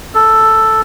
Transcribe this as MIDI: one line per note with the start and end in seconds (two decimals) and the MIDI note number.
0.15 0.82 69